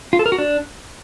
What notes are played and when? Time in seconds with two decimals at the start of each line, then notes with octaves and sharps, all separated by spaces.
0.13 F4
0.19 A4
0.26 A#4
0.32 F#4
0.38 D4